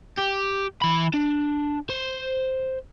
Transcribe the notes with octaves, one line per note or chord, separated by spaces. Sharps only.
G4
E3 B5
D4
C5